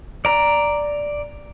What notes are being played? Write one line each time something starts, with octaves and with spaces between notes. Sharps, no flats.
D5 A#5